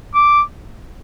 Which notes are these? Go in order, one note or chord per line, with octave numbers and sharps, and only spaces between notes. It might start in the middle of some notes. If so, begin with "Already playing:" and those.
D6